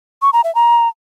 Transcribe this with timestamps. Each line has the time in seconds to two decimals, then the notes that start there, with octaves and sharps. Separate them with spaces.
0.22 C#6
0.33 A#5
0.44 E5
0.55 A#5